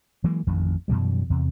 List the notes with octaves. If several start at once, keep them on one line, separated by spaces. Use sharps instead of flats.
E3 F#3 G#3 A#3
A1 F2 D#3
F#2 B2 E3 G3
E2 C3